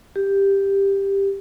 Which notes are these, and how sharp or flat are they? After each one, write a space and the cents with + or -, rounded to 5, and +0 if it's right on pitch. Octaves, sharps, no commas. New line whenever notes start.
G4 +10